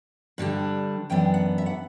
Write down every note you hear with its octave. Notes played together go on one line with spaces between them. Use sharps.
G2 D3 G3 D4
F#2 E3 B3 D4 G5
F#5
E5
F#5